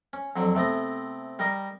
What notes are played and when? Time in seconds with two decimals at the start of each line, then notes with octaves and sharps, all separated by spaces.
0.13 C#4
0.36 F2 D3 F#3
0.55 C3 A3 B3 D#5
1.39 G3 A#4 D#5